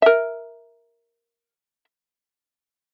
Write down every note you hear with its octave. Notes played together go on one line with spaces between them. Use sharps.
A#4 E5